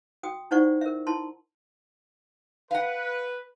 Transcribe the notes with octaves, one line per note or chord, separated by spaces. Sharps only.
F#4 G5 D#6
D#4 E4 C5 D5 F#5 C#6
A#4 E5
E4 A5 C6
B4 F5 F#5